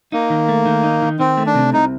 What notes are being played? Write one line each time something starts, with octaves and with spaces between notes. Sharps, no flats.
A#3 D#4
D#3
A3
D#3
D#4
D#3
D#3 C4
A3
D4
C3
C2 D#4